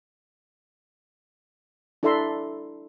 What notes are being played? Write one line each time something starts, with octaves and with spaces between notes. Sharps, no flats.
D4 E4 A4 E5 A#5 C6